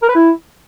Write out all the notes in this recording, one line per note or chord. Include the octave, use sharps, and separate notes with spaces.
A#4
B4
E4